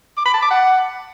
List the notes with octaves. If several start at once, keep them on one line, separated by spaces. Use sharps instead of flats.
D6
B5
A5
D6
F#5